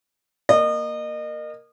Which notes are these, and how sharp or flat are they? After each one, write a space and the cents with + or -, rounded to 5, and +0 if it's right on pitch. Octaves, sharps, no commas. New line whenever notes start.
A#3 +0 D#5 -30